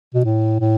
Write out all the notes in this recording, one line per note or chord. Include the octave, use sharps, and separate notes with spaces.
B2
A2
A2